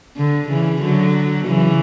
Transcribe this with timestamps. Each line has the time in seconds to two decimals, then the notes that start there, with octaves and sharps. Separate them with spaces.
0.17 D3
0.49 C#3 E3
0.82 D3 F#3
1.46 C#3 E3